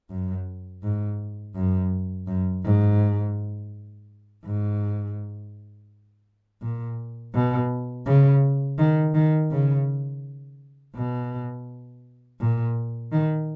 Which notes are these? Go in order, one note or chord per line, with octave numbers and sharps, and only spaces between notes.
F#2
G#2
F#2
F#2
G#2
G#2
A#2
B2
C#3
D#3
D#3
C#3
B2
A#2
D#3